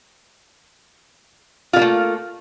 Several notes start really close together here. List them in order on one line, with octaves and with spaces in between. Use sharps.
F4 D3 A#3 A3